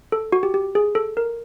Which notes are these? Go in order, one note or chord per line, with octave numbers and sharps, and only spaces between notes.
A4
F#4
G4
G4
G#4
A4
A#4